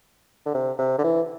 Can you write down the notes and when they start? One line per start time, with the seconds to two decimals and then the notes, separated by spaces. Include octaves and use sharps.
0.46 D3
0.54 C3
0.79 C3
0.98 D3
1.04 E3